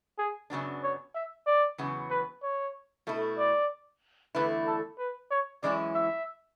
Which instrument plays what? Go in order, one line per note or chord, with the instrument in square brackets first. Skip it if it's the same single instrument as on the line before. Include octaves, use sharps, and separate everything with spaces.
[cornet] G#4
[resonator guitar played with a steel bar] F#2 C#3 F#3 B3 D4
[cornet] C#5
E5
D5
[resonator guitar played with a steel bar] E2 C#3 F#3 B3
[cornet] B4
C#5
[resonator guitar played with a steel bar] B2 A3 E4
[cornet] D5
[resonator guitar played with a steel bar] E2 D3 A3 E4 [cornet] B4
[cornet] A4
B4
C#5
[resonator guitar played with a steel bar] F#2 E3 G#3 C#4 E4 [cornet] D5
[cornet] E5